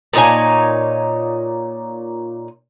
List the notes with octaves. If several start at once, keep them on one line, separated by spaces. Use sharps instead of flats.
A#2 D#4 C#5 G#5